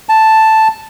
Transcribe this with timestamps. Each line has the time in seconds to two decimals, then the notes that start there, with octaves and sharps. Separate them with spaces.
0.09 A5